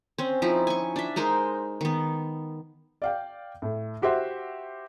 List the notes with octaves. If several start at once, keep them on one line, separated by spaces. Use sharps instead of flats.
C4 C#4
F3 D#4 E4
G#5 C#6
D4 E5
G#3 D#4 A#4 C5
D#3 B3
D5 F5 G5
A2
E4 F#4 G4 C5 E5 F#5